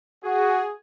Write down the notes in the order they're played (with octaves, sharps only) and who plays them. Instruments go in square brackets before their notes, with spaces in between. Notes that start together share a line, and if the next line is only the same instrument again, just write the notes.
[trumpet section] F#4 [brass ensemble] G#4